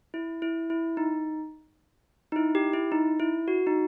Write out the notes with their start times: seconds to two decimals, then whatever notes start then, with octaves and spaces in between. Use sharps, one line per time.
0.14 E4
0.42 E4
0.70 E4
0.97 D#4
2.32 D#4
2.36 E4
2.55 G4
2.73 E4
2.92 D#4
3.20 E4
3.48 F#4
3.67 D#4